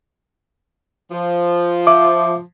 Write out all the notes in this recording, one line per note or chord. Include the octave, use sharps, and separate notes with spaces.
F3
E5 D6